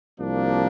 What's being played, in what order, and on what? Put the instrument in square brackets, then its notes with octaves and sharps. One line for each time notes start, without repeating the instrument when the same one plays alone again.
[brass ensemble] C2 C3 F3 A#3 D4